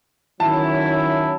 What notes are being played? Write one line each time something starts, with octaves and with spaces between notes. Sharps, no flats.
D#3 F#3 C#4 E4 A5